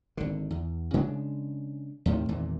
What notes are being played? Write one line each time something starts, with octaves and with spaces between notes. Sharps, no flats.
G#1 D3
E2
C#3 G#3 A#3 D4
D#2 A2 C3 D#3
G#1 E2 A#2 E3